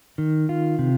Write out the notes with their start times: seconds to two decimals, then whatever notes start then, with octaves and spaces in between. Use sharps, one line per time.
0.18 D#3
0.49 F4
0.79 C3